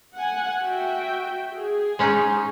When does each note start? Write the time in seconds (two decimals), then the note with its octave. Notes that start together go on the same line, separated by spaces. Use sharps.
0.17 F#5 G#5
0.62 F#4 E5 G5
1.54 G#4
1.99 G#3 C#4 D#4